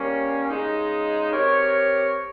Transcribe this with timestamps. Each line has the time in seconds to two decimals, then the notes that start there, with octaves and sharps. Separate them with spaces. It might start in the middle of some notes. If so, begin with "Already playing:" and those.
Already playing: G3 A#3 C#4
0.49 C#3 G#3 D#4
1.31 C4 G4 A#4 C#5